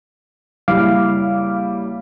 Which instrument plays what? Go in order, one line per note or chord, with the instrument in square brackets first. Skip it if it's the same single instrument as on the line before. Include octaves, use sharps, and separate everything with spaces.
[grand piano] F#1 G3 E4 [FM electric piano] F5 D6